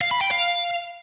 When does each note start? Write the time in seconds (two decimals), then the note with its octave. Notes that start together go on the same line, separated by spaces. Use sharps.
0.01 F5
0.11 B5
0.21 G5
0.31 F5